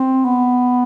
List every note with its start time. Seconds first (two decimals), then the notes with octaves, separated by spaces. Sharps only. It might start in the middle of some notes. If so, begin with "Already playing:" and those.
Already playing: C4
0.25 B3